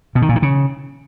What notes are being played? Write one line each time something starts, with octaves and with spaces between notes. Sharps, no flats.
B2
D#3
A#2
D#3
C#3